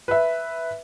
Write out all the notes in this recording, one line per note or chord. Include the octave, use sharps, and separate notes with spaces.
B4 E5